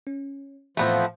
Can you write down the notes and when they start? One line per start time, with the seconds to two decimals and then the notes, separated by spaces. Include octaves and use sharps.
0.07 C#4
0.77 A2 E3 F3 A3 B3 C4